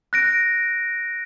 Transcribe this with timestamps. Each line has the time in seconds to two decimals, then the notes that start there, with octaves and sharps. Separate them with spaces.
0.13 F#6 A#6 D7